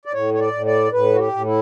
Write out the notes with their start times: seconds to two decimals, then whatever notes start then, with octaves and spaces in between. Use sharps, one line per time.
0.05 D5
0.13 A2 C#5
0.34 C#5
0.40 D5
0.53 A2
0.66 D5
0.92 A2 B4
1.14 F#4
1.19 G4
1.32 A2
1.46 E4